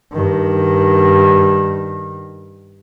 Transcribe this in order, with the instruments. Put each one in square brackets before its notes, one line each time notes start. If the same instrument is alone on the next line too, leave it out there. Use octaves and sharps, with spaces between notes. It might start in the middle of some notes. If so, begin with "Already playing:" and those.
[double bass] G2 D#3